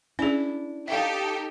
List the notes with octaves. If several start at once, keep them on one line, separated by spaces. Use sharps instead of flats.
C#4 D4 E4 G#4
D#4 G4 A4 E5 F5